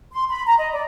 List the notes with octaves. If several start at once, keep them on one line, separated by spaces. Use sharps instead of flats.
C6
B5
A#5
D#5
D5